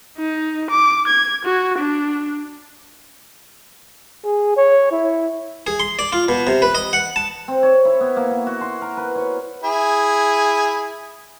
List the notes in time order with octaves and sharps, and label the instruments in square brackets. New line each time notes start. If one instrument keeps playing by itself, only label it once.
[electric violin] D#4
D6
G#6
F#4
D4
[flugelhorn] G#4
C#5
E4
[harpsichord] G#4
C6
D5
F4
B2
C3
B4
D#5
F#5
A5
[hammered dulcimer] C4
C#5
E4
B3
A#3
B3
F#4
C6
A#4
B4
C#5
[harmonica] E4 G#4